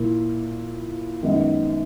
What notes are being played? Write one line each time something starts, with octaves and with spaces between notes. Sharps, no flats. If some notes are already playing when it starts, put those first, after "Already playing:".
Already playing: A#2 A#3 E4
F#2 D#3 G#3 B3 D#4